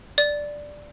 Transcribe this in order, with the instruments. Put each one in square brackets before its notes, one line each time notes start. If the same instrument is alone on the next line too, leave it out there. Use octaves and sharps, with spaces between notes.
[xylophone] D5